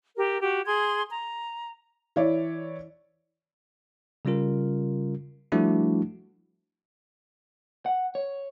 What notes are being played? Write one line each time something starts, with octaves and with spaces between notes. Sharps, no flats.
G4 A#4
F#4 G4
G#4 C6 G#6
A#5
E3 E4 C#5 D5
C#3 G3 C#4 F4 A#4
F3 G3 A3 D4 E4 F#4
F#5
C#5